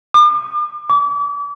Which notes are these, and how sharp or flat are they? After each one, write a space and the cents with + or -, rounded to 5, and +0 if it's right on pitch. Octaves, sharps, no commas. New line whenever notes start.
D6 +40
D6 -35